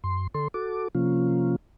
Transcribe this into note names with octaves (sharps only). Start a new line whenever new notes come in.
F#2 C6
D3 A4 C6
F#4 A4 D6
C3 F3 A#3 C#4 F4